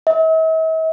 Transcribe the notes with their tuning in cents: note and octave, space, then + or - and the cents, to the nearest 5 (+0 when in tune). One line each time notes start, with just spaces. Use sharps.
E5 -45